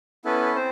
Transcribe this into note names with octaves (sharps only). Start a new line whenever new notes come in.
B3 C#4 E4 A4 B4
C4 C5